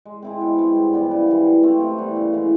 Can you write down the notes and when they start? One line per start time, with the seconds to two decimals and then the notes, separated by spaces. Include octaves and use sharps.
0.05 G#3
0.22 C4 E4 G#4
0.41 B2
0.58 G#3 C4
0.75 G2
0.93 E3 G3 B3
1.11 C#3
1.27 E3 G3 B3
1.46 F#3
1.63 A3 C4 F4
1.80 C3
1.98 E3 G3 B3
2.16 C#3
2.33 E3 G#3